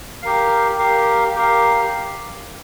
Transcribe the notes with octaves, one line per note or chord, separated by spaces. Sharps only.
G4 A#4 F5
G4 A#4 F5
G4 A#4 F5